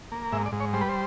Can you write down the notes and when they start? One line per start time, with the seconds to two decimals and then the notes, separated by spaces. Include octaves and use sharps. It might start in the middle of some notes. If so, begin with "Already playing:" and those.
0.12 A#3
0.32 G#2 E5
0.46 D5
0.52 G#2
0.60 C#5
0.73 G3 C5
0.81 B4
0.89 C5